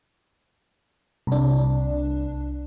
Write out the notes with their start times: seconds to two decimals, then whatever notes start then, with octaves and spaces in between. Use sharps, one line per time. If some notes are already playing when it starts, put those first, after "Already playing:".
1.27 C2 D4